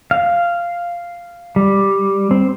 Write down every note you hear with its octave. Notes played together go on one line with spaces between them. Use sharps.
F5
G3
C4